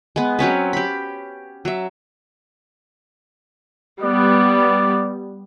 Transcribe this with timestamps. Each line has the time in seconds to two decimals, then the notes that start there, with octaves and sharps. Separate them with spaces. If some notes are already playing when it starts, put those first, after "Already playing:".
0.16 G#3 B3
0.39 F#3 C4 C#4 B4
0.73 G4 B5
1.65 F#3 E5
4.02 G3 B3 D5